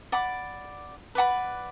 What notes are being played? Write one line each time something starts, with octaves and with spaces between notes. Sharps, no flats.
D5 F#5 B5 D6
B4 D5 F#5 B5